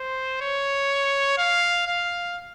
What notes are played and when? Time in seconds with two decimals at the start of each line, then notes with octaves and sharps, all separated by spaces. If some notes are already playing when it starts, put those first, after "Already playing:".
Already playing: C5
0.41 C#5
1.38 F5
1.86 F5